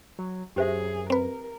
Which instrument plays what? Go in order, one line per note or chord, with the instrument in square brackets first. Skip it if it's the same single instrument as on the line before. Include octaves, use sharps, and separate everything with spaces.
[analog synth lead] F#3
[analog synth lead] F#2 [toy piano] G4 C5 E5 [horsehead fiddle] G#4
[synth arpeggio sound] C4 B4 [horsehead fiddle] A#4